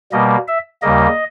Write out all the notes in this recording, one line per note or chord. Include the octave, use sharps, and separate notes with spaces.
B2 G3 A#3 D#5
E5
D#2 C#3 G3 A#3 D#5